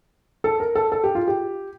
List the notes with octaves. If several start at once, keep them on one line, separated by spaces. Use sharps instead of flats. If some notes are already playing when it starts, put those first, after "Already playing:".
A4
A#4
A4
A4
G4
F4
G4